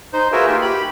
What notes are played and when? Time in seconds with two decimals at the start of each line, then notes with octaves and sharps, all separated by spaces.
0.13 D#4 C5
0.32 F4 F#4 G#4 A#4 B4 E5
0.47 A#3 D#4 F4 G4
0.62 G4 B5